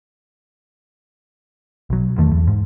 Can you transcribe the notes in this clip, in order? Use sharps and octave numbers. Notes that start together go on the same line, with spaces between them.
B1 F#3
E2 D#3 A3
E2
G#2